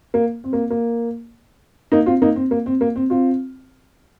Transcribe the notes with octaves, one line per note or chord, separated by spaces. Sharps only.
A#3
C4
A#3
A#3
A#3 D#4
C4 F4
A#3 D#4
C4
A#3
C4
A#3
C4
C4 F4